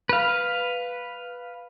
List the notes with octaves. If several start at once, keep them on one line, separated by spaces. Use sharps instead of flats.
B4 F5